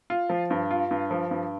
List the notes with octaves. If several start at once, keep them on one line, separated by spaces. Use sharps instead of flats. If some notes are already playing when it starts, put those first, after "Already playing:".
F4
F3
G2
F4
G2
F3
G2